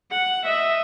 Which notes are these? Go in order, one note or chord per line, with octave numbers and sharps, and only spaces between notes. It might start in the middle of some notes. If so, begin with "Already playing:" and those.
F#5
D#5 E5